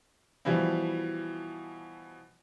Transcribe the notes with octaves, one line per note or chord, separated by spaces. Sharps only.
B2 E3 F3 G3 E4